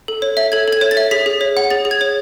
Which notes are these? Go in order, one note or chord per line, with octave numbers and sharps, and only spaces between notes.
A4
C#5
E5
A4 G#6
A4 G#6
C#5
A6
E5
G#4 B6
G#4
C#5
F#5
G#4 A6
G#4
G#6
C#5